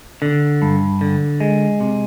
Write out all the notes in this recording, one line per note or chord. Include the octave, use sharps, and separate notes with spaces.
D3
G2
D3
G#3
C3